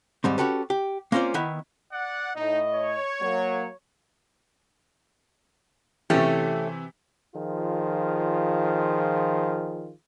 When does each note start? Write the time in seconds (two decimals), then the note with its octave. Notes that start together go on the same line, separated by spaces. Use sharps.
0.24 D#2 G#2 G3 C4
0.38 C#4 F#4 G4 A4 B4
0.70 G4
1.12 A#3 C4 C#4 F4 C5 D5
1.34 D#3 B3 E4
1.93 D5 F#5
2.36 A2 D#4 D#5
2.73 C#5
3.20 F#3 A#3
6.10 C3 E3 A3 C#4 G4
7.35 D#3 F3 F4 G#4